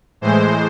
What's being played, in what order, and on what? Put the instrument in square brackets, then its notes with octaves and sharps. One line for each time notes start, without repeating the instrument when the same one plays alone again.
[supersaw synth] A2 E3 G#3 C5